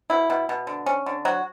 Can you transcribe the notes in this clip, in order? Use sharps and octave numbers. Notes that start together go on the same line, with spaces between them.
B2 E4
B2
B2
D3
C#4
D3
F#3 F#4